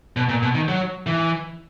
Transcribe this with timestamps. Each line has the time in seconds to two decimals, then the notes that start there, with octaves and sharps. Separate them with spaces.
0.17 B2
0.29 A#2
0.42 B2
0.55 D#3
0.68 F#3
1.07 E3